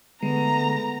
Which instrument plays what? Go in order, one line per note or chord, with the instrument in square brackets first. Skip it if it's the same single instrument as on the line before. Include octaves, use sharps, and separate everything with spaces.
[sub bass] D3 [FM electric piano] G#3 [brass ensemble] A3 B3 [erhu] A#5